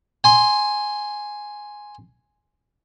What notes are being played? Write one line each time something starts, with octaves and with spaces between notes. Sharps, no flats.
G#5 C6